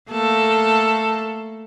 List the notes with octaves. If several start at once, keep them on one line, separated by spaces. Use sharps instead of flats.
A3 A#3 A4